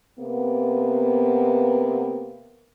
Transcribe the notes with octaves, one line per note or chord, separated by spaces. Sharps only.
C3 A#3 B3